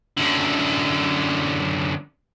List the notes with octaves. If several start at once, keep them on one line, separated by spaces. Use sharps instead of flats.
F#2 D3